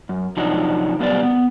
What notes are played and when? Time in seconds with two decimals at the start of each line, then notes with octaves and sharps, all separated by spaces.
0.09 F#2
0.37 C3 F3 F#3 D4 D#4 F#4
1.00 F#2 B2 G3 B3 F#4 D5
1.23 B3